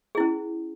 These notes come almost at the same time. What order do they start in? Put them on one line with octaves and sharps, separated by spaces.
G#4 E4 C#4